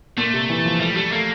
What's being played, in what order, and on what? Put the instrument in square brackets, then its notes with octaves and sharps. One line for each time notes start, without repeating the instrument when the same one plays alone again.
[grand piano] A#2 [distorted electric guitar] A3
[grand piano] C3
E3
F3
[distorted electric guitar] G3 [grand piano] A3
[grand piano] G3 [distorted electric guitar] A3
[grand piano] A3 [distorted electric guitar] A#3